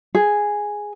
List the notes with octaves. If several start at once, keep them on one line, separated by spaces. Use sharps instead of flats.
G#4